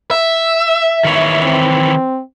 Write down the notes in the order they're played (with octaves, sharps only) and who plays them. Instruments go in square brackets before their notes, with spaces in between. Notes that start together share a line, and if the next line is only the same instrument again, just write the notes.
[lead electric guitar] E5
[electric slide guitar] D#3 E3 C#5
[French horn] C4